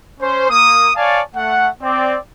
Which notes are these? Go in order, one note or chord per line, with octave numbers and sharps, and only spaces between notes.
C#4 C5
A#3 D#6
C#5 D5 F5 G#5 A5
A3 F#5
C4 D5